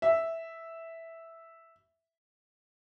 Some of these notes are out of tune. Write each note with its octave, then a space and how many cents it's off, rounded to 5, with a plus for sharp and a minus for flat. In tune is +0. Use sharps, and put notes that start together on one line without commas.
E5 -5